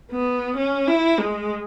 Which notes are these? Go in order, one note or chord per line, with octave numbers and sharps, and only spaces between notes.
B3
C#4
E4
G#3